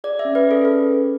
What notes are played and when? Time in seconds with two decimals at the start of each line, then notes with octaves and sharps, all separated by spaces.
0.04 G#4 D5
0.19 E5
0.25 C#4
0.35 B4
0.44 G#4
0.51 A4
0.65 C#4 B4